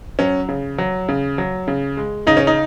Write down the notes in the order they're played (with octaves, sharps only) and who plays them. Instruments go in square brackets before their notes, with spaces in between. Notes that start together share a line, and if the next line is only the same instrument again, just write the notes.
[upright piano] F#3 C#4
C#3
F#3
C#3
F#3
C#3
G#3
C#3 D#4
C#4
D#4